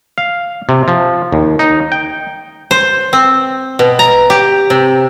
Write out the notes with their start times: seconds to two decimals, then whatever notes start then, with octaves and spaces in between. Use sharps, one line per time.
0.18 F5
0.69 C3
0.88 F3
1.32 D#2
1.59 D#4
1.92 G5
2.71 C5
3.13 C4
3.79 B2
3.99 A#5
4.30 G4
4.70 C3